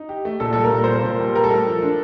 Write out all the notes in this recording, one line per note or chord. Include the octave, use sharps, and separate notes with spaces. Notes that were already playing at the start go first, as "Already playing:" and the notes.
Already playing: D#4
G4
A3
A#2 A4
G3 A4
A#4
A#2
C5
A#3 A#4
A#2 C5
G3
G4 A#4
A4
A3 A#4
F3
D4